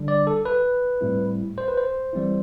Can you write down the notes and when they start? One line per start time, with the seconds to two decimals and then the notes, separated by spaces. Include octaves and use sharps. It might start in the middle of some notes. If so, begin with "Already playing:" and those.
Already playing: D3 G3 D4
0.08 D5
0.27 A4
0.45 B4
1.01 A2 G3 C4 E4
1.58 C5
1.68 B4
1.77 C5
2.13 E3 G3 C4 E4